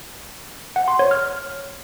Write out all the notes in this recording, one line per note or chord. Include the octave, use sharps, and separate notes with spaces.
F#5
C6
C#5
F6